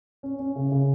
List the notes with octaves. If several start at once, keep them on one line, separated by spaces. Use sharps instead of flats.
C#4
C#4
C#3
C#3